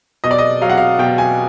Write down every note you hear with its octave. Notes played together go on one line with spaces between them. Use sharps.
B2 D#5
D5
D#5
F#3 F5
F#5
F5
B2 G5
G#5